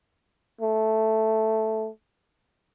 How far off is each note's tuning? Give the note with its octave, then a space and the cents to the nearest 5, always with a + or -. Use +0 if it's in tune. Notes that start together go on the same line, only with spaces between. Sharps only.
A3 +0